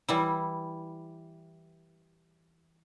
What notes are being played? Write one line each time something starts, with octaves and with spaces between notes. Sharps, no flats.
E3 G3 E4